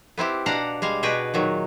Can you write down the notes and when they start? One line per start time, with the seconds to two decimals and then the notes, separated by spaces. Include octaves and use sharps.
0.18 B3 C4 E4 G4
0.46 B2 D4 F5 F#5 A#5
0.82 G3 G#3 F5
1.03 B2 F#4 G#4 B4 G5
1.34 A#2 D#3 F#3